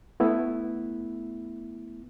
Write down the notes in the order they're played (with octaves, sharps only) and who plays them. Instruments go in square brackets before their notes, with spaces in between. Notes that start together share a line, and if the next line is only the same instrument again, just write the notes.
[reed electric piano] A3 B3 E4